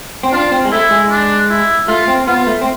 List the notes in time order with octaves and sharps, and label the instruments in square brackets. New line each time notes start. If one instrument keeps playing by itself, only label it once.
[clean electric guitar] C4
[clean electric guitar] D4 [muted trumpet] F4
[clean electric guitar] C4
G#3
[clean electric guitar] A3 [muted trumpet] E4
[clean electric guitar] G#3
[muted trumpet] D4
E4
[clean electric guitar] A3 [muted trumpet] F4
[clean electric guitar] C4
[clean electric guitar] B3 [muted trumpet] F4
[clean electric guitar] A3
C4